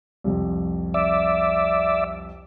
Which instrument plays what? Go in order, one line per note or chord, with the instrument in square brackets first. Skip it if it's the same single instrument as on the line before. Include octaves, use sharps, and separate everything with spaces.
[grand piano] C2 F2
[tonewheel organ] D5 E5